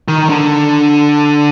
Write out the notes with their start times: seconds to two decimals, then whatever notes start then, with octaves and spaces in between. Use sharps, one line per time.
0.08 D#3
0.29 D3